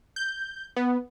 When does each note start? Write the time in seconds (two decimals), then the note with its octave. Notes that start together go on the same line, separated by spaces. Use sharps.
0.16 G6
0.76 B3